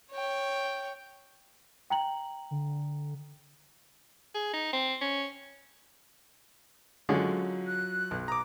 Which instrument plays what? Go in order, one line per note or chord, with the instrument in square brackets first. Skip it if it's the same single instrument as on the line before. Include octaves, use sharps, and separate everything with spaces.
[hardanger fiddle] C#5 G5
[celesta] G5 A#5 F#7
[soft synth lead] D3
[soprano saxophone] G#4
D#4
C4
C#4
[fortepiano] D3 G#3 C#4 [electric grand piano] F#3 F4
[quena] F#6
[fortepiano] B1
[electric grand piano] A#5 D6 [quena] D#6